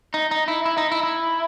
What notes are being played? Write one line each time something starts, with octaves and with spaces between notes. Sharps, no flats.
D#4
D#4
E4
E4
D#4
E4
E4